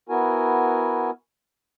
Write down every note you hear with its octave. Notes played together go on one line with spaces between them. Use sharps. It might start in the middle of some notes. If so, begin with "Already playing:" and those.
B3 E4 F#4 A#4 G#5